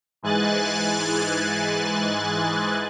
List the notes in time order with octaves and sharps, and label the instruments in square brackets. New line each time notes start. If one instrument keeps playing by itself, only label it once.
[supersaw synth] G#2 E3 G#3 G#5 F#6 A6